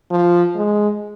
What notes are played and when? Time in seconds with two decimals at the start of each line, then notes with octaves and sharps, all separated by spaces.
0.11 F3
0.56 G#3